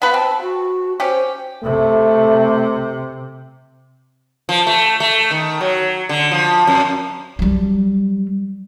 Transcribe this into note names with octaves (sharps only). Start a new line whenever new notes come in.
B3 F4 B4 F5
C4 A5
F#4
C#4 G4 C5
C3 A3
F3
A3
A3
D#3
F#3
D3
F3
F2
F#3 G3